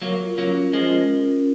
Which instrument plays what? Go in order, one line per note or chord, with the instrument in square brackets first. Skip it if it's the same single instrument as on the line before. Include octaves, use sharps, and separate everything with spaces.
[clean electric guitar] F#3 A#3 [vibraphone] A#4
[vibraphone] F4
[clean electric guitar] F#3 A#3 [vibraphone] C#4
[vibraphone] F4
[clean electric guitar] F3 G#3 [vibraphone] C#4
[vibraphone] A#4
A#4
C#4